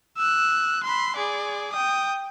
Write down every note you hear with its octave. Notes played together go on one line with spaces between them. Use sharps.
E6 F#6
B5 C6
G#4 D5
G5 D#6